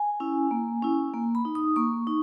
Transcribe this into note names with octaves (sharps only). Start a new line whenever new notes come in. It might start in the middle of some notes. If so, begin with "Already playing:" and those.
Already playing: G#5
C#4 E4
A#3
C#4 E4
A#3
B5
D#4
D#6
A#3 C#6
D#4